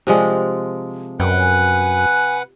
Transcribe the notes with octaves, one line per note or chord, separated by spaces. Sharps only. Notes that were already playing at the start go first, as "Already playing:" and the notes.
C3 F3 G#3
F#2 A#4 B4 F#5 G5
G#5